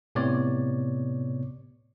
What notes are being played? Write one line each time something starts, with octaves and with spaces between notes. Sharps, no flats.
A2 C3 B3 C#5 D5